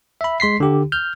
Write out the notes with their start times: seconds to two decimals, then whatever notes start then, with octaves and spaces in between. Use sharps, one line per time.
0.21 E5 B5
0.40 G#3 C6 B6 C7
0.60 D3 G4
0.92 F6 G6